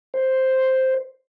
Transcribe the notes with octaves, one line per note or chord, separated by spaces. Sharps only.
C5